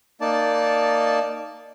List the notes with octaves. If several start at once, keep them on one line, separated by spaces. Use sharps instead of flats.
A#3 D#4 D5 A5